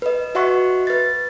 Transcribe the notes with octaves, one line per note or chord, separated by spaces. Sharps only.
B4 D#5
F#4 D#5 E5 F#5 C6 C#6
B4 A6